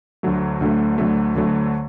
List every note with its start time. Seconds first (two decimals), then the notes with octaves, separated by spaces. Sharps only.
0.23 D2 D3 F#3 A3
0.61 D2 D3 F#3 A3
0.98 D2 D3 F#3 A3
1.35 D2 D3 F#3 A3